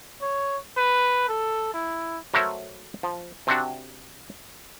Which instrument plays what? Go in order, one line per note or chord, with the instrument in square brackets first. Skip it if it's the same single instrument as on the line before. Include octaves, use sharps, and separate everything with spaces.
[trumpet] C#5
B4
A4
E4
[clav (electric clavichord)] F#3 A3 A#4 C5 C#5 E5
F3
C3 C4 D4 F#4